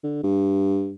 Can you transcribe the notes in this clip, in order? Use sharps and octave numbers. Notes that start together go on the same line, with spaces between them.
D3
G2